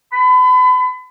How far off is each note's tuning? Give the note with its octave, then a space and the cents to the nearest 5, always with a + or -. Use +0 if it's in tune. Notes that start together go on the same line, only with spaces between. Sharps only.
B5 +35